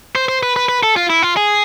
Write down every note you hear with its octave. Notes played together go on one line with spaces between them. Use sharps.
C5
C5
B4
B4
B4
A4
F4
E4
F4
G#4